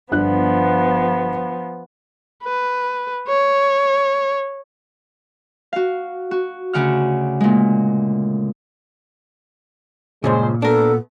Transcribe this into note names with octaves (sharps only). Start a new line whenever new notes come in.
G1 F3 B3 D4 F#6
B4
C#5
F#4 F5
F#4
D2 C#3 F#5 F6
A#2 G#3
C#2 G2 A#2 C#3 G#3 C5
B3 D4 A4 A#4